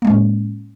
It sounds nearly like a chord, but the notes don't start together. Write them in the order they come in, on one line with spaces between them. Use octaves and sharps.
A#3 G#3 C#4 A2